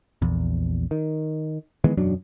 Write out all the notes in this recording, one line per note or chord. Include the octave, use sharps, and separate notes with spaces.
A#1 E2
D#3
D#3 E3 G#3 B3
E1 F#2 F#3 D4